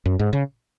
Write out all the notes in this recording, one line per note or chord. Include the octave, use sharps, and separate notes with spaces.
F#2
G#2
C#3